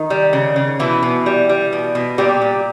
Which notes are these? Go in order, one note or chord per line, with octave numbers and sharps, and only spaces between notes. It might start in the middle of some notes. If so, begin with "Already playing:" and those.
Already playing: D#3 D#4
G3
C#3
C#3
B2 E3 E4
B2
G3
G3
B2
B2
A#2 G3 G4
A#2